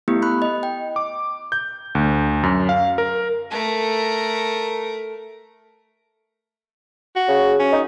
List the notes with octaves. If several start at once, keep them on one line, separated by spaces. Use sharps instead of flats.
A3 B3 E4 G4
B5 F#6
D#5
G5
D6
G6
D2
F#2
F5
A#4
A3 A#4
F#4
C#3
C#4
D#4